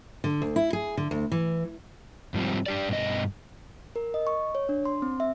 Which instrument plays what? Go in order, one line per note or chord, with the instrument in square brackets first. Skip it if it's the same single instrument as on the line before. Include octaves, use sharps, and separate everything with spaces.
[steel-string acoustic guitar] D3
D2
E4
G#4
D3
D2
E3
[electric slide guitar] G#2 F3 G3 C4
D4 G4 D5
G2 B2 D#5
[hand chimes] A#4
D#5
C#6
C#5
D4
C6
C4
E5